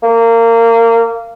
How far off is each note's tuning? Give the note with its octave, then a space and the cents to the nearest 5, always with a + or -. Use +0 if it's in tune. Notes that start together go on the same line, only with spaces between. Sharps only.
A#3 -25